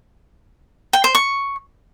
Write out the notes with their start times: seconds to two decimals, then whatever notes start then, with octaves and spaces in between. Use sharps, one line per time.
0.93 G5
1.04 C5
1.15 C#6